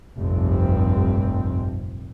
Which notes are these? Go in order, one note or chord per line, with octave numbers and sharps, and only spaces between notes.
F1 A#1 G2 C4